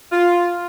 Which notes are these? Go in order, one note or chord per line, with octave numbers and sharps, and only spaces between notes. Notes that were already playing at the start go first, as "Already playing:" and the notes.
F4